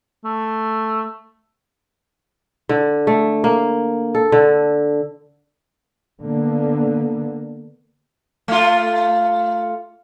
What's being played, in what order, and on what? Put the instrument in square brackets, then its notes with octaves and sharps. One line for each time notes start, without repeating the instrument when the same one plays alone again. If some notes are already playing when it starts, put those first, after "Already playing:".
[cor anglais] A3
[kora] D3
A3
A#3
A4
D3
[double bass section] D3 A#3 B3
[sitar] A3 F4